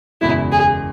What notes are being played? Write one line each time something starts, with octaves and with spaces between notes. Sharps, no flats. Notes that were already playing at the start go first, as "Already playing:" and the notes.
F#1 E2 B2 G#3 E4
G#4